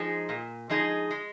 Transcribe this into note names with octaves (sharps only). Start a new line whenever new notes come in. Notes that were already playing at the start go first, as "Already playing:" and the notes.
Already playing: F3 G#3 D#4 G#4
A#2
F3 G#3 D#4 G#4
G#3